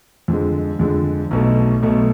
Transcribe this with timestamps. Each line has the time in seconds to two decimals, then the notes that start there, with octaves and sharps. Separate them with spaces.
0.28 F2 D3 G#3
0.79 F2 D3 G#3
1.31 B1 B2 A3
1.83 B1 B2 A3